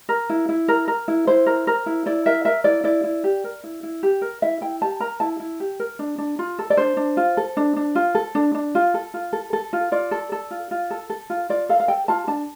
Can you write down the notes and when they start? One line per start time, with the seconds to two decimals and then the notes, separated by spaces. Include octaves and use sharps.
0.09 A#4
0.30 E4
0.49 E4
0.68 A#4
0.88 A#4
1.08 E4
1.27 E4 C5
1.46 A#4
1.67 A#4
1.86 E4
2.06 E4 D5
2.26 A#4 E5
2.45 A#4 E5
2.64 E4 D5
2.84 E4 D5
3.04 E4
3.24 G4
3.44 A#4
3.64 E4
3.83 E4
4.03 G4
4.22 A#4
4.42 E4 E5
4.61 E4 G5
4.81 G4 A5
5.00 A#4 A#5
5.20 E4 A5
5.40 E4
5.60 G4
5.80 A#4
5.99 D4
6.18 D4
6.39 F4
6.59 A4
6.70 D5
6.77 D4 C5
6.97 D4
7.17 F4
7.37 A4
7.57 D4
7.76 D4
7.95 F4
8.15 A4
8.35 D4
8.55 D4
8.75 F4
8.94 A4
9.14 F4
9.33 A4
9.53 A4
9.73 F4
9.92 F4 D5
10.11 A4
10.32 A4
10.51 F4
10.71 F4
10.91 A4
11.10 A4
11.30 F4
11.50 F4 D5
11.69 A4 F5
11.80 F5
11.88 A4 G5
12.08 F4 A5
12.27 D4 A5